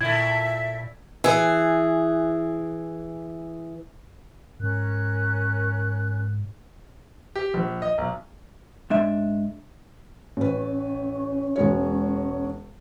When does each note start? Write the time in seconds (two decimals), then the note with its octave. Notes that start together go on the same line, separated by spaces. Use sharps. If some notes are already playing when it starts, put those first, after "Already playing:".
0.01 A#2 A3 E4 E5 G#6
1.24 E3 G#4
4.60 G#2 C#4 A#4 F#6
7.36 G4
7.54 A#1
7.82 D#5
7.98 B1
8.90 G#2 D4 E5
10.37 A1 C#4 B4
11.56 E1 G#3 C#5